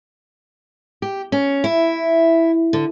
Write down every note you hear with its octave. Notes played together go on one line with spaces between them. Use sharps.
G4
C#4
E4
D3